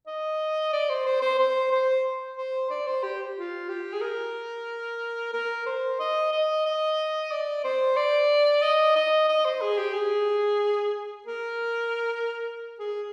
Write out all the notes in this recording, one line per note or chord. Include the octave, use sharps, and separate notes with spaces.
D#5
D5
C5
C5
C5
C5
C5
C5
D5
C5
G4
F4
G4
G#4
A#4
A#4
C5
D#5
D#5
D#5
D5
C5
D5
D#5
D#5
D#5
C5
G#4
G4
G#4
A#4
G#4